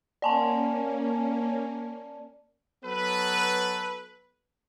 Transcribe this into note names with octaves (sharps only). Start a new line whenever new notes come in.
A#3 C#4 D5 G#5 A5
F#3 B3 A4 B4